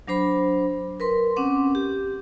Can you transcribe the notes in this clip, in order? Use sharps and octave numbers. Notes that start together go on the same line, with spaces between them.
F#3 D4 C5 B5
A#4 B4 C6
C4 C#4 F#5 D6
G4